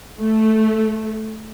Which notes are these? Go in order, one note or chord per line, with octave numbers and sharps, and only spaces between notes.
A3